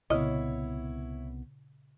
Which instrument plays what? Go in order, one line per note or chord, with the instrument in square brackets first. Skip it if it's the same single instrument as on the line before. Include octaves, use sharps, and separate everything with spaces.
[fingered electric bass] C2 B3 [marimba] A#2 C#3 [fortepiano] E4 C#5 [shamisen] D#5